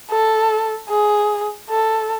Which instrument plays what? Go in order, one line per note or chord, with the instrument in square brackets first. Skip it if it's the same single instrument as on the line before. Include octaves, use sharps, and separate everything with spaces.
[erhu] A4
G#4
A4